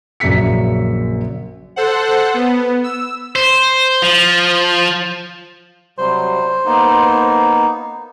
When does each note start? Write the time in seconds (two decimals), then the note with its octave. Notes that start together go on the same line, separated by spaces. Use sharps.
0.20 A#1 F#2 C#3 E5 B6 C#7
1.76 A4 C5 F#5
2.34 B3
2.84 E6
3.36 C5
4.02 F3
5.98 C3 F#3 G3 C5
6.65 A#3 B3 D#4